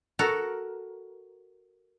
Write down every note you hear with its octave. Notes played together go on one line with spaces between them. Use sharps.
F#4 A4 A#4